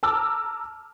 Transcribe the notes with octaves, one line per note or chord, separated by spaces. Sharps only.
A5 A#5 D6 E6 F6